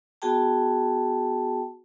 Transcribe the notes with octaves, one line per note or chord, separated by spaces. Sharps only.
B3 F#4 G#4 G5 A5